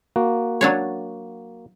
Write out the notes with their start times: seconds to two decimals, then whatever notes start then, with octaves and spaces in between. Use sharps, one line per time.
0.16 A#3 F#4
0.61 F#3 D4 C#5